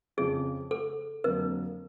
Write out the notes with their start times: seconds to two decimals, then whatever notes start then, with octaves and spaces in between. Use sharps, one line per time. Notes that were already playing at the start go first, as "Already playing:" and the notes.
0.17 F2 C#3 F3 G#4
0.71 A4
1.24 F2 D3 F#3 A#3 A#4